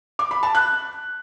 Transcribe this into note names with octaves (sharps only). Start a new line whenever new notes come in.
D6
B5
A5
F#6